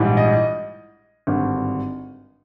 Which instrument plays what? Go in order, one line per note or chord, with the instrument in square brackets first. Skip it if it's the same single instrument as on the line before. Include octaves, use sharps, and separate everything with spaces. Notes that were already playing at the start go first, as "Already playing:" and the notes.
Already playing: [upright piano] A#1 G#2 E3 G3
D#5
G#1 G2 D3